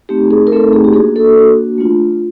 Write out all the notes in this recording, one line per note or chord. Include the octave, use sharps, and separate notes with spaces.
A3 C4 D#4 G4
G#4
A#4
A3 C4 D#4 A4
G#4
G4
A#3 D4 F#4 G#4
A4
A#3 D4 F#4
A3 D4 F4